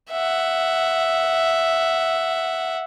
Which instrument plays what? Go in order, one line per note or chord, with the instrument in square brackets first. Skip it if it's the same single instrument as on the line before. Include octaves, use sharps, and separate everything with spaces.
[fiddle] E5 F#5